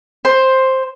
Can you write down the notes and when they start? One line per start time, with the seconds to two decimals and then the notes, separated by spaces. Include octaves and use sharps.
0.25 C5